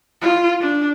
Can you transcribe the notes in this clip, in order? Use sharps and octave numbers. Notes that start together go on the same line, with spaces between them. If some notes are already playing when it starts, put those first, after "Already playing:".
F4
D4